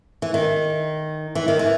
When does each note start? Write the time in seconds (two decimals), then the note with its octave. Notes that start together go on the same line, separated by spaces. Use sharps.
0.22 E3
0.34 D#3
1.35 E3
1.48 D#3
1.59 E3